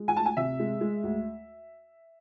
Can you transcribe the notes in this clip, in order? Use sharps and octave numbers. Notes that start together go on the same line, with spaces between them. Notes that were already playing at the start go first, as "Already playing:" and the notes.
Already playing: G#3
G#5
D2 A5
G#5
C3 E5
G#3
G#3
D2